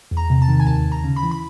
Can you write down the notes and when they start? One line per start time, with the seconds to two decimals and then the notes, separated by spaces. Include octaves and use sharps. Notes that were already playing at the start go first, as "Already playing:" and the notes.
0.11 E2
0.17 A#5
0.30 C3
0.42 A5
0.48 D#3
0.60 G#5
0.67 D#2 A5
0.85 D#2
0.92 A#5
1.04 C#3
1.16 B5
1.23 E3
1.31 B5